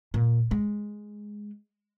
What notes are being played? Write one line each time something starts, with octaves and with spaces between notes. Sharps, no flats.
A#2
G#3